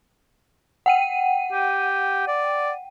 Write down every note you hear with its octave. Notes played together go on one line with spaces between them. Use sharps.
F#5 G5 D#7
G4
D5